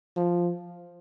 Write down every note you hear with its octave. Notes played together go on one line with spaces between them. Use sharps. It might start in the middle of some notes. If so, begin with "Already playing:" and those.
F3